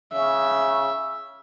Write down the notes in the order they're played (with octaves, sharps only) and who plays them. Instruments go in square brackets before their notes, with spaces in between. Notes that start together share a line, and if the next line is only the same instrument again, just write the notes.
[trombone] C#3 [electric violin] E5